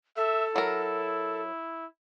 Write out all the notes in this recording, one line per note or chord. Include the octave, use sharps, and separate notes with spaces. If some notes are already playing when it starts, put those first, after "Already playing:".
A4 E5
F#3 E4 A#4